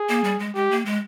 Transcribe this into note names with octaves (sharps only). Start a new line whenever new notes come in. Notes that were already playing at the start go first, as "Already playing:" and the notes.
Already playing: G#4
A#3
G3
G#3
G#3 G4
A#3
G#3